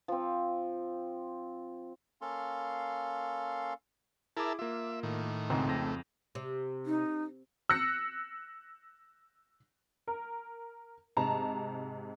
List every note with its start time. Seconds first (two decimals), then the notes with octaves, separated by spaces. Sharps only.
0.08 F3 C4
2.21 A#3 C#4 A4 F5 C6
4.37 E4 G#4 A#4 E5 A5 D6
4.59 A#3 F4 E5
5.03 A2 D#3
5.50 C#2 G#2 C4
5.69 F2 A3 A#6
6.35 C3
6.86 D#4
7.69 E6 F#6 A#6 C#7
10.07 A#4
11.17 G#2 C3 A5 A#5